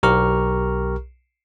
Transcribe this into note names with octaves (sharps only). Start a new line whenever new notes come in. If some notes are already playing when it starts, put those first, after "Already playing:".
B1 G4 A#4 A#5 C#6 F6